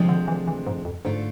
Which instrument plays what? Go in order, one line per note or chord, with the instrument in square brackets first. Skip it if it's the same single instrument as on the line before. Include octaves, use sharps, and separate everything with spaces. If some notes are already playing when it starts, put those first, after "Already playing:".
Already playing: [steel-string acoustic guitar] D2 C3 F3 G#3 D4
[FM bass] D3
E3
E3
G#2
F2
[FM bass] G#2 [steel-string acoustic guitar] D3 A3 D4 F4